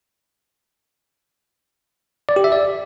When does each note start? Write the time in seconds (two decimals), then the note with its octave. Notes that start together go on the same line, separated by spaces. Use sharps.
2.29 D5
2.36 G4
2.44 E5
2.52 D5